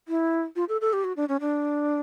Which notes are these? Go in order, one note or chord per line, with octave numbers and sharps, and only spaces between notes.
E4
F4
A4
A4
G4
F#4
D4
C#4
D4